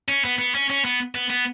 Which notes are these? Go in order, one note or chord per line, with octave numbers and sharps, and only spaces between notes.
C#4
B3
B3
C#4
C#4
B3
B3
B3